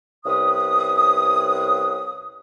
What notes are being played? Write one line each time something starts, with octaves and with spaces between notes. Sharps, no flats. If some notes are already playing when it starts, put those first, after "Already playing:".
C2 C#4 B4 D#6